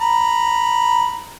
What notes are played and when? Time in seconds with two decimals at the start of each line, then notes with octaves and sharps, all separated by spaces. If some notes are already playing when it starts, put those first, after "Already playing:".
0.01 A#5 B5